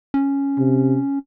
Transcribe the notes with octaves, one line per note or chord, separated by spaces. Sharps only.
C#4
C3